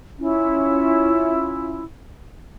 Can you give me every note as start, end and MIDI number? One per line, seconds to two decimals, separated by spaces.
0.18 1.81 61
0.18 1.81 64
0.18 1.81 65